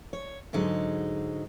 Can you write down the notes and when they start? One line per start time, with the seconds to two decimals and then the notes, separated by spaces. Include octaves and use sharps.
0.13 C#5
0.53 G#2 D3 F#3 G#3 D#4